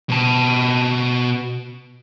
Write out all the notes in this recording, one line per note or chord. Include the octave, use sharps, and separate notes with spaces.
B2 A5